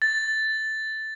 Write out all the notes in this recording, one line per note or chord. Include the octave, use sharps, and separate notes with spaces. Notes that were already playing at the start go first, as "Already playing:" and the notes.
A6